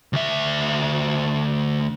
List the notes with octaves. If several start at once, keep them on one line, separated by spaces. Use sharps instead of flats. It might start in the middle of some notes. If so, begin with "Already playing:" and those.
D2 E5